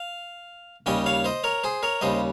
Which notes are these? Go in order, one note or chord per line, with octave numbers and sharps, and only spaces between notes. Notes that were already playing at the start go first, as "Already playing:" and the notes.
Already playing: F5
D#2 C#3 G3 C#4 D#5 G5
C#5 F5
C5 D#5
A#4 C#5
G#4 C5
A#4 C#5
D#2 C#3 G3 C5 D#5